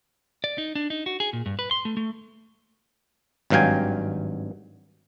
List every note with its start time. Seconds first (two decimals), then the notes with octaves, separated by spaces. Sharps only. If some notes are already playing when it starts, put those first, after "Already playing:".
0.44 D5
0.58 D#4
0.75 D4
0.90 D#4
1.06 F#4
1.20 G#4
1.33 A#2
1.46 G2
1.59 B4
1.71 C6
1.85 A3
1.97 A3
3.50 G#1 G2 F#3 F5 G5 G#5